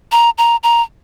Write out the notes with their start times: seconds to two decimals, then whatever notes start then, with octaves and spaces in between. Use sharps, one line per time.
0.12 A#5
0.38 A#5
0.63 A#5